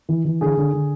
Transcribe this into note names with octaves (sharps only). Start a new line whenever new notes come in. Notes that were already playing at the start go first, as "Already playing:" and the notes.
E3
E3
D3 G#4
D3
D3